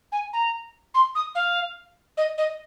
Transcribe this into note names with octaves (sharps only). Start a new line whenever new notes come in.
G#5
A#5
C6
D#6
F5
D#5
D#5